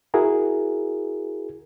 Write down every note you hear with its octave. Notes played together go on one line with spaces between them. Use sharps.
E4 F#4 G#4 A#4